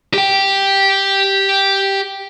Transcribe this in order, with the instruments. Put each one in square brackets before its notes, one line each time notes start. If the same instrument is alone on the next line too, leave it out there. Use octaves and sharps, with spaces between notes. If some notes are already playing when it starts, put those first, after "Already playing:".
[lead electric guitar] G4 G5